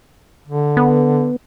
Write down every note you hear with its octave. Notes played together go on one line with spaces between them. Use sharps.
D3
B3